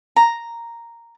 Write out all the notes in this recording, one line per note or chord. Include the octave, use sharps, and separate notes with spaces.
A#5